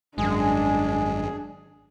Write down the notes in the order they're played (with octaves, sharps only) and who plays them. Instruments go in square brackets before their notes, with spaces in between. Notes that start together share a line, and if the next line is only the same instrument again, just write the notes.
[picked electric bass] G#1 F#2 [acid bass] G#3 [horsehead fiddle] D4 [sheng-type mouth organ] G#4